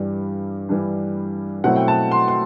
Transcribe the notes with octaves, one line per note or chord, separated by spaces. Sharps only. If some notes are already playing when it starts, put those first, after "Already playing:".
Already playing: G2 E3 G3 D4
G2 E3 G3 D4
B2 F#3 A3 C4 E4 F#5
G5
A5
C6
C6